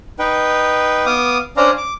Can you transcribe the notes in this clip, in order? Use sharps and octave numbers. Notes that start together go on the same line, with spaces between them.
D#4 B4 G5
B3 F5 D6 D#6
C#4 D4 C5 D5 F5 A#5
D6